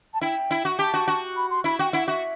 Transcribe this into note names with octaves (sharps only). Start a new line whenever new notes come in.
A5
E4 G5
E4
F#4
G4 A5
F#4
F#4
B5
C6
E4 B5
F#4 G5
E4 F#5
F#4 E5